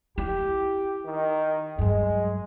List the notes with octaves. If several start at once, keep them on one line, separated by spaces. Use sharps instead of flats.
E4 G4
D#3
G2 F#3 G#3